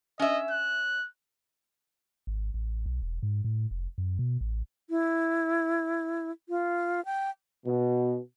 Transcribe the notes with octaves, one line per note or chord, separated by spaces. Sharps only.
C#4 D#5 E5
F#6
G#1
A1
B1
E1
G#2
A2
F1
F#2
B2
A1
E4
F4
G5
B2